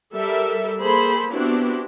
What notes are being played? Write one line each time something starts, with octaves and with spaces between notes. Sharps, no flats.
G3 A4 A#4 E5
A#3 G#4 A4 C5 B5
B3 C4 D4 E4 F#4 G4